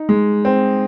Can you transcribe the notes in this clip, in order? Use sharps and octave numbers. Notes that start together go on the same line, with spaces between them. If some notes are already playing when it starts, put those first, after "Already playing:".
Already playing: D#4
G#3
C4